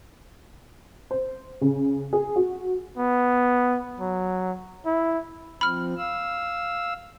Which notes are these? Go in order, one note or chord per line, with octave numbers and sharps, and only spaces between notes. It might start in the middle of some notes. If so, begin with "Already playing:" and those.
C5
C#3
G#4
F#4
B3
F#3
E4
F3 C4 B5 F6
F5 E6